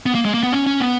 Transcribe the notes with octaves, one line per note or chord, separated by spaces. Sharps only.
B3
A#3
G#3
A#3
B3
C#4
C#4
B3